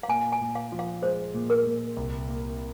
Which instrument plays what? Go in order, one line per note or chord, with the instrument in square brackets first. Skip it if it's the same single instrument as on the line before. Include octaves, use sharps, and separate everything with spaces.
[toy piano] F5
[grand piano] A#2 [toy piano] G#5
[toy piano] G#5
[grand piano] A#2
[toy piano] F5
[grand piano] F3
[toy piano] F5
[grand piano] G#3 [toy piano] C5
[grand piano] A#2
[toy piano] A#4
[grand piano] A#2
C2
A#3